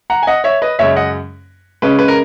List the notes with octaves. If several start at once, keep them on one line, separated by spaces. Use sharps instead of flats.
F#5 A#5
G#5
D#5 F#5
C#5 E5
B4 D#5
F#2 C#3 G#3 C#5 E5
D#5 F#5
C#3 G#3 C#4 B4
B4
A#4